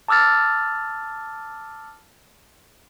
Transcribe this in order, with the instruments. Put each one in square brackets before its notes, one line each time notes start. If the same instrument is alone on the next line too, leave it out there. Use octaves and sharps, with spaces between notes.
[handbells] A5 D6 E6 F6 A6